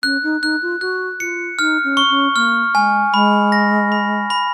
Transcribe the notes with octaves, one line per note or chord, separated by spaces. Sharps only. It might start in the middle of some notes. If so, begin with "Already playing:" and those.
C#4 F#6
D#4
D#4 F#6
F4
F#4 F#6
F4 C#7
D#4 F6
C#4
C#6
C#4
A#3 F6
G#3 G#5
G#3 B5
A#6
B5
B5